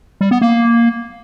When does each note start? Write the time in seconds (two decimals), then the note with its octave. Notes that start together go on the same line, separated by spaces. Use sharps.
0.21 G3
0.31 B3
0.41 A#3